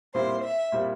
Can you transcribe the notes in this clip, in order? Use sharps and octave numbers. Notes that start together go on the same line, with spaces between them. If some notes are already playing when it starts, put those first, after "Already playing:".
A#2 G3 C4 E4 C5
E5
A#2 G3 C4 E4